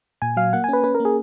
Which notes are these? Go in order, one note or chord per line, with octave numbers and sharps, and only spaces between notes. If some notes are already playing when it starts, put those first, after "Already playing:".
A#2 G#5
F#3 F5
A#3 F#5
G#5
C#4 B4
C#4 B4
A#4
A#3 G#4